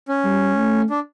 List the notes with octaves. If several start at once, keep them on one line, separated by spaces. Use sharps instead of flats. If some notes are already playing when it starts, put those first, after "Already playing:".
C#4
G3
A3
D4